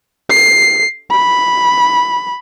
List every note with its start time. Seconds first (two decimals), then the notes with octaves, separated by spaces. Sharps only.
0.30 C7
1.11 B5